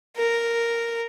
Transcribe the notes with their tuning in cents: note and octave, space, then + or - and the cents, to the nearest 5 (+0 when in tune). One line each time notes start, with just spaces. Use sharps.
A#4 -5